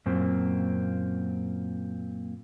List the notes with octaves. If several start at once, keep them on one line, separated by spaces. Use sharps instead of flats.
F#2 A#2 A#3 C4